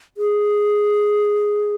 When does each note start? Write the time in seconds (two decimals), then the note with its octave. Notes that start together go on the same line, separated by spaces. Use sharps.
0.17 G#4